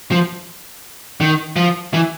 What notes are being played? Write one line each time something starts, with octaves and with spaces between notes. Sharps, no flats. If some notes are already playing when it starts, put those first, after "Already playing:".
F3
D#3
F3
E3